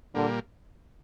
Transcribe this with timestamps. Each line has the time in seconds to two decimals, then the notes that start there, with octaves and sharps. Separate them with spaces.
0.15 A#2 D3 G3 A#3